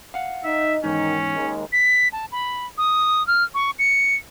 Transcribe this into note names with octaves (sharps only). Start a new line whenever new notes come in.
F5 F#5
D#4 D#5 E5
E2 G#2 D#3 C#4 D#4
D#2 D#3 G#3
B6
A5
B5
D#6
F6
C#6
C#7